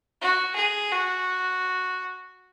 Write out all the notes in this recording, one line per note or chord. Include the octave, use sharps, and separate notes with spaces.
F#4
G#4
F#4